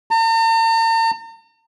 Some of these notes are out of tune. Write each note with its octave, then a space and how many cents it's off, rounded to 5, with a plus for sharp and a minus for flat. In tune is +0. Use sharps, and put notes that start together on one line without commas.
A#5 -45